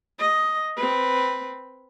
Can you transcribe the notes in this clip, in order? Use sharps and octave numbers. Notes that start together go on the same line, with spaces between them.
D#5
C4 B4